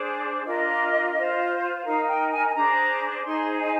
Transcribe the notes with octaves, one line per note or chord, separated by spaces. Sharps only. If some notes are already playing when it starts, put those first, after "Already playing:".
Already playing: D4 G#4 C5
D4 F4 A#4 D#5
F4 C5
D#4 A#4 F5
G5
G#5
G#5
D4 G#4 C5 A#5
D#4 G#4 C5 C6
G#5